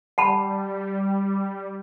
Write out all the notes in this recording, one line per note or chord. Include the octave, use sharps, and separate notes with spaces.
G3 F#5 A5 B5